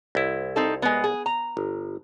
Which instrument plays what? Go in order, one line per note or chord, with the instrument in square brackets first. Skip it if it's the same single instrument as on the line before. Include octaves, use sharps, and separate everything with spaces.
[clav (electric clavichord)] C2 E4
[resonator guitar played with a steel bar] C4 D#4 A4
G#3 B3
G#4
A#5
[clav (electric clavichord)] G1